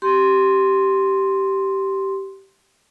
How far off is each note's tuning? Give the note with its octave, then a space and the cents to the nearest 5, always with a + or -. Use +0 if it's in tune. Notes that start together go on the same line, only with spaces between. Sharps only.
G4 -15 C6 +0